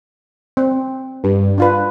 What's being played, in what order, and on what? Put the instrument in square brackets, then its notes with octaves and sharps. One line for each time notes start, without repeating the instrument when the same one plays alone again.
[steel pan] C4
[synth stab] G2
[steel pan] D4 F4 B4